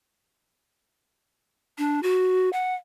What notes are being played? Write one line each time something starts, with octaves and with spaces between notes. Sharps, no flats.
D4
F#4
F#5